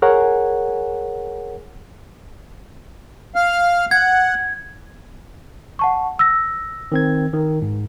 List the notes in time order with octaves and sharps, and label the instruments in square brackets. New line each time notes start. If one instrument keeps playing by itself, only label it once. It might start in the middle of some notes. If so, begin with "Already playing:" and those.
[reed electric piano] G#4 A#4 C#5 F#5 G#5
[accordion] F5 F6
[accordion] F#5 [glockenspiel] G#6
[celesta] F#5 A5 C#6
E6 A#6
[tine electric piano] D#3 C4 G#6
D#3
G#2